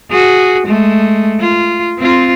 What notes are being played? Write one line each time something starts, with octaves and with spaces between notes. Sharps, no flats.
F#4 G#4
G#3 A3
F4
C4 F4